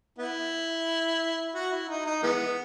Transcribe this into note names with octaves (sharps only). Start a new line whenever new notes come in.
B3 E4
F#4
E4
D#4
D#4
E3 G#3 B3